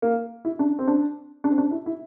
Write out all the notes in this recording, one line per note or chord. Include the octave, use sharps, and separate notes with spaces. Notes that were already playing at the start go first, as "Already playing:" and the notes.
A#3
E4
D4
C4
D4
D4
C4
D4
E4
E4